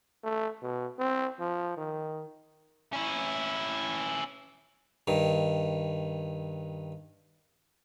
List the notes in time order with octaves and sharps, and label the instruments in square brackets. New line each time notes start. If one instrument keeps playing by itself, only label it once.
[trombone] A3
B2
C4
F3
D#3
[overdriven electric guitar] C#4 E4
[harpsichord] G2 D#3